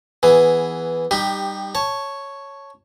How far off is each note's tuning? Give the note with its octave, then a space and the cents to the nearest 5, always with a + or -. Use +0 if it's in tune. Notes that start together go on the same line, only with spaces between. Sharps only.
E3 +0 B3 +5 G#4 +0
G3 +0 D#4 -25 G4 +15
C#5 +0 A5 +0